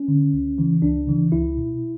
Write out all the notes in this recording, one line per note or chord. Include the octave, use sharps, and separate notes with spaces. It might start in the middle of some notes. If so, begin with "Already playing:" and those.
Already playing: C#4
D3
C#2
C#3 E3
C#2 D4
C#3 E3
C#2 E4
B2